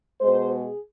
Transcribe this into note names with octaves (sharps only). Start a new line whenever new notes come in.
B2 G#3 C5
G#4